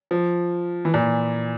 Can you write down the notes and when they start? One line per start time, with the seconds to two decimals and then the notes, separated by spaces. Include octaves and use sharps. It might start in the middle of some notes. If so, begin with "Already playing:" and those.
0.11 F3
0.85 E3
0.94 A#2